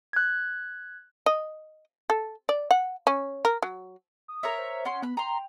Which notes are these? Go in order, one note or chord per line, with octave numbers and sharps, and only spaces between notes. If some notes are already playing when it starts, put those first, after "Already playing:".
F#6 G#6
D#5
A4
D5
F#5
C#4
A#4
F#3
D#6
A#4 C#5 E5
C5
C#4 F#5 C6
B3 B5 F#6
G5 A#5 C6